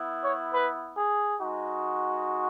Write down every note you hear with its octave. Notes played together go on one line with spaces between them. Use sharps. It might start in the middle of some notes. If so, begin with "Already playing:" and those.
Already playing: B3 E4
C#5
B4
G#4
G#3 D#4 F#4